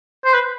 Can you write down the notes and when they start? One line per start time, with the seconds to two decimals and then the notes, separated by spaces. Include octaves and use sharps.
0.25 C5
0.34 B4